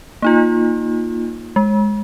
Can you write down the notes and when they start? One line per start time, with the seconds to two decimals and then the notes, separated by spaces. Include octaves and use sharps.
0.22 A#3 D#4 F4
1.56 G#3